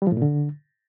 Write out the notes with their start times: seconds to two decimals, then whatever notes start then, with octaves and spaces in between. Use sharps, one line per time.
0.02 G3
0.07 F3
0.12 A2
0.17 A#2
0.22 D3